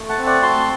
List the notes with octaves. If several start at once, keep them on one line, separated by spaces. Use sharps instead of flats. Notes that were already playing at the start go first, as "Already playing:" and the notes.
Already playing: A3
F#5 A5
C4
D5 F#5
F#4 A5 C6